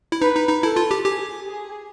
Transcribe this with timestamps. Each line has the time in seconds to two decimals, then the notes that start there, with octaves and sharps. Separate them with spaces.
0.12 E4
0.21 D#4 B4
0.36 D#4
0.49 D#4
0.62 E4 A4
0.76 F4
0.91 G4
1.05 G4 G#4
1.47 G#4